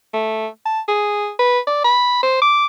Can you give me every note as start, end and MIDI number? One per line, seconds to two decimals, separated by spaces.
0.14 0.47 57
0.66 0.80 81
0.88 1.30 68
1.39 1.59 71
1.67 1.80 74
1.84 2.19 83
2.23 2.40 72
2.42 2.66 86